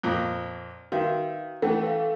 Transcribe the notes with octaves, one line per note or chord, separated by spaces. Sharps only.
F2 A#2
D#3 F#4 B4 E5 F5
E3 A3 C#4 F#5 G5
B4 F5